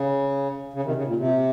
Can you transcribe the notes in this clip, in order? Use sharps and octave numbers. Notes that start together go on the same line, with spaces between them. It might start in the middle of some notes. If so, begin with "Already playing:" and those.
Already playing: C#3
C#3
C3 D#3
C#3
A#2
C3